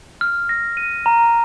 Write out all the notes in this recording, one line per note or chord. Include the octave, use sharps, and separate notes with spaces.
F6
A#6
D#7
A#5